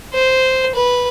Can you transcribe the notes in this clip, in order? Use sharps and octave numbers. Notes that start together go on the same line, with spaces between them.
C5
B4